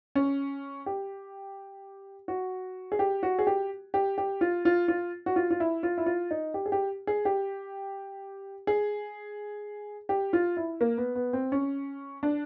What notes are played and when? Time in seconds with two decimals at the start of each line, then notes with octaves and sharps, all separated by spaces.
0.15 C#4
0.86 G4
2.28 F#4
2.92 G#4
2.99 G4
3.23 F#4
3.39 G#4
3.47 G4
3.94 G4
4.18 G4
4.41 F4
4.65 F4
4.88 F4
5.26 F#4
5.36 F4
5.50 F4
5.60 E4
5.83 F4
5.98 E4
6.06 F4
6.31 D#4
6.54 G4
6.66 G#4
6.72 G4
7.07 G#4
7.25 G4
8.67 G#4
10.09 G4
10.33 F4
10.57 E4
10.81 A#3
10.98 B3
11.15 B3
11.33 C4
11.52 C#4
12.23 D4